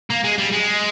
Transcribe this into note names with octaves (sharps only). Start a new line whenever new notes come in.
A#3
G#3
G3
G#3